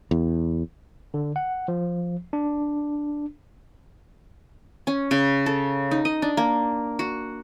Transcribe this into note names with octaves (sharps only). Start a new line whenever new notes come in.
E2
D3
F#5
F3
D4
C#4
C#3
A4
D#4
D#5
D4
A#3
F#4